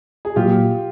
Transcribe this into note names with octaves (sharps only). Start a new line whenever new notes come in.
G#4
A#2 F#3 A#3 F4 G4